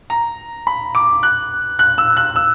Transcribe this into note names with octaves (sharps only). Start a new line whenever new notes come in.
A#5
B5
D6
F#6
F#6
E6
F#6
E6